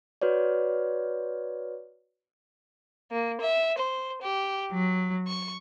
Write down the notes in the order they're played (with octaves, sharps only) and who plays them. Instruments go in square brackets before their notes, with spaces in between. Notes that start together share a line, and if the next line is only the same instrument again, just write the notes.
[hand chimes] F#4 B4 C#5 D5
[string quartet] A#3
E5
C5
G4
F#3
C#6